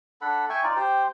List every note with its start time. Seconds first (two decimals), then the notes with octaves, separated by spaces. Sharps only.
0.21 D4 A4 F#5 B5
0.49 E5 G5 G#5 C#6
0.63 D#4 F4 D5
0.76 G4 C5 G5